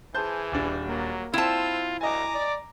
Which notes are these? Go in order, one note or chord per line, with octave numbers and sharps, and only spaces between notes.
E3 G#4 C5 A5 G6
D#1 D4
F#3 A#3
C4 E4 F4 C5 A5 E6
D2 D#5 G#5 A#5 D6
D5